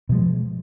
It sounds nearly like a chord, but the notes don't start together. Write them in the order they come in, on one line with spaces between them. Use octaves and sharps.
B2 F3 G#3